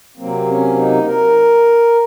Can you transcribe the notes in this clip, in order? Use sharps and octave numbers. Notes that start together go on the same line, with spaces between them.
C3 F#3 A#3 C4
C#4
D#4
A#4